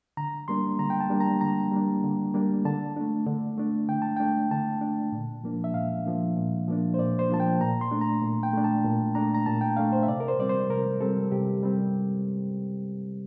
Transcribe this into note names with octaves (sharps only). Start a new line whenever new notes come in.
D3 A#5
G3 A#3 D4 C6
D3 A#5
G5
A5
G3 A#3 D4
A#5
D3 A#5
G3 A#3 D4
D3
G3 A#3 D4
D3 A5
A3 D4
D3
A3 D4
D3 G5
A5
A3 D4 G5
D3 A5
A3 D4
A#2
F3 A#3 D4
E5
A#2 F5
F3 A#3 D4
A#2
F3 A#3 D4
C5
A#2 D5
C5
F3 A#3 D4 A5
G5
A#2 A#5
C6
A3 D4
A#5
A#2
G5
A3 D4
A5
A#2
A3 D4 A#5
A#5
A#2 A5
G5
A3 D4 F5
C5
E5
C3 D5
A#4
C5
G3 C4 D5
C5
C3 A#4
G3 C4 A4
C3 G4
G3 C4